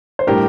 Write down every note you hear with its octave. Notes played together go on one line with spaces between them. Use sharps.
C5
A2 G3 D4 G4 A#4